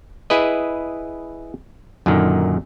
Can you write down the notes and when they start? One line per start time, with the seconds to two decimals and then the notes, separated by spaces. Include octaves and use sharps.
0.30 E4 G#4 B4 D#5
2.06 F#2 A#2 D3 D#3